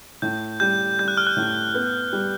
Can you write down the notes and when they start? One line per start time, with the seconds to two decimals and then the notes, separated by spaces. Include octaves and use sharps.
0.22 A2 G6
0.60 G3 G6
0.99 G3 G6
1.08 F#6
1.17 F6
1.27 F#6
1.36 A2
1.74 B3
2.13 G3